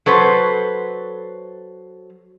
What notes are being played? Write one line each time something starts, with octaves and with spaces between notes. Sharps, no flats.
F#3 A4 B4 C5